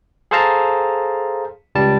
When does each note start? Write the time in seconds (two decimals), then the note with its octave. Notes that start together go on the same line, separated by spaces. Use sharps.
0.31 G#4 A4 C5 F5 A5 A#5
1.75 C#2 G3 A5